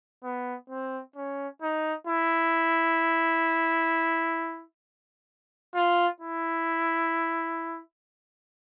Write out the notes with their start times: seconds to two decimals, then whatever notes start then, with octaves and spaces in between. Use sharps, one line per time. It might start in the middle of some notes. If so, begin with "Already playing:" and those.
0.24 B3
0.70 C4
1.16 C#4
1.62 D#4
2.07 E4
5.75 F4
6.20 E4